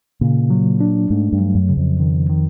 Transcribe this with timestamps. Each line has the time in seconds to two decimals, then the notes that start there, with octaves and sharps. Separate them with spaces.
0.21 A#2 C#3
0.50 F#3
0.81 D4
1.10 G#2 A3
1.33 G2
1.39 F#3
1.55 F#2
1.69 C#3
1.77 F2
2.00 D#3
2.29 D#3